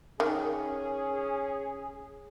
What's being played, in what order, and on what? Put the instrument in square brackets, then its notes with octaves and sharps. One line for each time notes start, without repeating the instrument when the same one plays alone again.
[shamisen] D#3 [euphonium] C#4 [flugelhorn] G#4